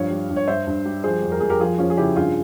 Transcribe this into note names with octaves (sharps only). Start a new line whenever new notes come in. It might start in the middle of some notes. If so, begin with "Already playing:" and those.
Already playing: G2 F3 C#5 F5
G3
G2
C#5
G2 C5 E5
G2
G3
F3 G#4 C5
F2
A#4
F2 G#4
G4 A#4
F3 F4 G#4
F3 C#4 F4
G#4
C#3 E4 G4
G2 F4 G#4